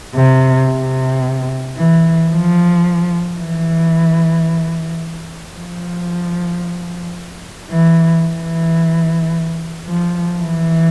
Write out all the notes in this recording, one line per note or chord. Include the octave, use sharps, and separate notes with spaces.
C3
C3
E3
F3
E3
F3
E3
E3
F3
E3